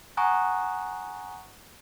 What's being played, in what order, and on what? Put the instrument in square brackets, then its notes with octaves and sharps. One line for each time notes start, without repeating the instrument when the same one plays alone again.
[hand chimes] F#5 G#5 A#5 C#6 D#6 F#6